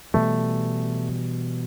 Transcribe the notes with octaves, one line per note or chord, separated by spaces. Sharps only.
B2 E3 G3 A3